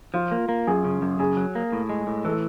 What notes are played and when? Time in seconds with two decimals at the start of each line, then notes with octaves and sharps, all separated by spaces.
0.14 F3 F4
0.32 A#3
0.49 A#3
0.67 F#2 G#4
0.85 C#3
1.02 F#2
1.19 C#3 G#4
1.37 F#3
1.55 A#3
1.73 A2
1.89 G#3
2.07 A2
2.25 E3 A4